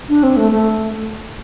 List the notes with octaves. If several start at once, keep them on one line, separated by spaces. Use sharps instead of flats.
D4
C4
A3
A3